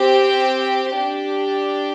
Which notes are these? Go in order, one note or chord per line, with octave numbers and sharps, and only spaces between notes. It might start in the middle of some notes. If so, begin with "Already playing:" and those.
Already playing: C4 G4
G5
D4 G4